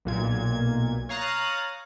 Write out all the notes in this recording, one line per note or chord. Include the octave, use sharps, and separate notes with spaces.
B1 A#2 G#6
C#5 F5 A#5 D#6 F#6 A6